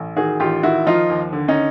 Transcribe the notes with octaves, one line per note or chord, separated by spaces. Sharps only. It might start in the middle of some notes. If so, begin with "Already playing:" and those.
Already playing: A1
D#3 F#4 G#4
A1 F4 G4
D#3 E4 F#4
F3 D#4 F4
D#2
D3
C#4 D#4